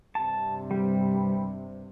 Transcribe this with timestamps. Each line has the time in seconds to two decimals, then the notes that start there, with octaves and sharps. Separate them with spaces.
0.15 G2 C3 A5
0.71 G3